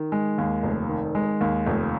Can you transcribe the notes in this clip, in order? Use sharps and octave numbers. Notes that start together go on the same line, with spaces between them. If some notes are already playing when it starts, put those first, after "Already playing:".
Already playing: D#3
G#3
D#2
F1
D#3
G#3
D#2
F1